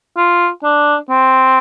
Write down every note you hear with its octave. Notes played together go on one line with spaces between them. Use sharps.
F4
D4
C4